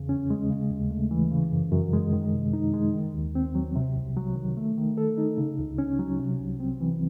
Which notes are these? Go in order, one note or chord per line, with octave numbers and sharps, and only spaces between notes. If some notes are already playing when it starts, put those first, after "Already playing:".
Already playing: E2 C#3
C#4
G#3
C#3
D#2
A3
E3
C#3
F#2
F#2
G#3
D#3
C3
D#4
G#3
D#3
D#2
C4
F#3
C3
C2
F#3
D#3
A3
D#3
A4
D#4
C#3
C#2
C#4
F#3
C3
C2
C4
E3